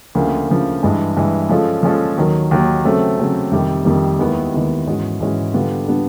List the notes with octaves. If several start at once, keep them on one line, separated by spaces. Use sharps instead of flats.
D2 C#3 F3 A#3
D2 C#3 F3 A#3
G2 E3 G#3
G2 E3 G#3
F3 G#3 C#4 F4 A4
F3 G#3 C#4 F4 A4
D#2 D#3 F#3
D#2 D#3 F#3
C#3 F#3 A3 C4
C#3 F#3 A3 C4
F2 C3 D#3 G3
F2 C3 D#3 G3
D#2 D#3 G#3 B3 E4
D#2 D#3 G#3 B3 E4
G#2 E3 G#3 C#4 F#4
G#2 E3 G#3 C#4 F#4
D3 G3 B3 D4 F4
D3 G3 B3 D4 F4